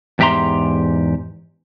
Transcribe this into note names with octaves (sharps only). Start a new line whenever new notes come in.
E2 G#2 G4 E5 A#5 C6